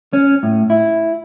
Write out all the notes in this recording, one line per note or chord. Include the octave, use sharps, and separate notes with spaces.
C#4
A2
E4